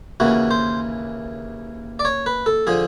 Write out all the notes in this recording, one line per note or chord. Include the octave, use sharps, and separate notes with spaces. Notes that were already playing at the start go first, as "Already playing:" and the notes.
D#2 C#3 E3 F#4
C5
D5
C#5
B4
A4
D3 F3 G#4